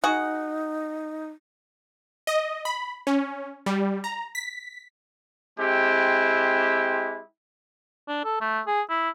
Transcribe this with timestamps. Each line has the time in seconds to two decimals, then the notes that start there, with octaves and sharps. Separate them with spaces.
0.04 D#4 F#4 G#4 F#5
2.27 D#5
2.65 B5
3.07 C#4
3.66 G3
4.04 A#5
4.35 B6
5.58 G#3 C4 E4 G4
8.08 D4
8.25 A4
8.41 A3
8.67 G#4
8.90 E4